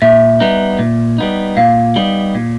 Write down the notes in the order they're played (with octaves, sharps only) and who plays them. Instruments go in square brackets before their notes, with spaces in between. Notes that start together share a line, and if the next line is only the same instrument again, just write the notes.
[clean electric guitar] A#2 [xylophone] E5
[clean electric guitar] G3 B3 D#4
A#2
G3 B3 D#4
[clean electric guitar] A#2 [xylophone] F5
[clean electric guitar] G3 B3 D#4
A#2